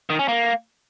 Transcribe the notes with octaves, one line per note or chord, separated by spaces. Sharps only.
D#3
C#4
A#3